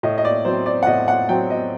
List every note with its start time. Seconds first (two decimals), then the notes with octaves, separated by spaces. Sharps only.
0.03 A2 D#5
0.18 D#5
0.25 D5
0.45 F#3 C4 C5
0.66 D5
0.83 F#5
0.87 A2 D#5
1.08 F#5
1.29 F#3 C4 G5
1.50 D#5